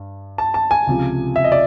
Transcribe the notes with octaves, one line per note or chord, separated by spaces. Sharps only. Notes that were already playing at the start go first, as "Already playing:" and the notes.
Already playing: G2
A5
A5
G#5
C#2 C3 F3
E5
D#5
D5